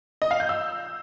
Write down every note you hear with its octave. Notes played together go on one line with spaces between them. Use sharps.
D#5
F5
G6
E6